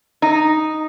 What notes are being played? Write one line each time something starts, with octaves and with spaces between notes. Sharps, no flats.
D#4